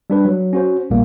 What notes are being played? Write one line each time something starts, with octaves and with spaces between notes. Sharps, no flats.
G3 D4 B4
F#3
C#4 F#4 C5
A#1 A#2 G3 A#3